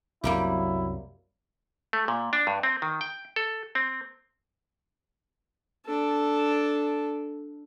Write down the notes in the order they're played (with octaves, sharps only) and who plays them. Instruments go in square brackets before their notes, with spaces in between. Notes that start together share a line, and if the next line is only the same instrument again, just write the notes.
[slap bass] C2 F#2 C4 [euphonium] F#3 [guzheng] G3 A#3 G4 [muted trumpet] E4
[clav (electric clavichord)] A3
A#2
D4
G2
C4
D#3
G5
A4
C4
[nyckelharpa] D4 A4